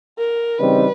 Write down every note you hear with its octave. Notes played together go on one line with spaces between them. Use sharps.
A#4
C#3 E3 G3 C4 D#4 B4